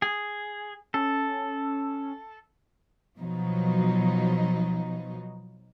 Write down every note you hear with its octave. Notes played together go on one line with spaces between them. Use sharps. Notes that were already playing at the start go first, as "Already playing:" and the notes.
G#4
C#4 A4
B2 F3 F#3 D#4